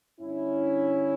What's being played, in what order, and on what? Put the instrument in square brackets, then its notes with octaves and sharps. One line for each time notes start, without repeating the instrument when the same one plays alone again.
[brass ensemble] G2 D3 C#4 E4